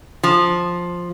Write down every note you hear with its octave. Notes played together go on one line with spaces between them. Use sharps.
F3